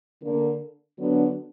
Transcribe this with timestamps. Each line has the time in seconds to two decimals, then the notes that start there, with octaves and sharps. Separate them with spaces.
0.22 D3 A#3 D4
0.98 D3 F#3 B3 D4